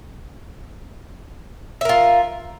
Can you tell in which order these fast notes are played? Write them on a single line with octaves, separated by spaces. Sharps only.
E5 A#4 F4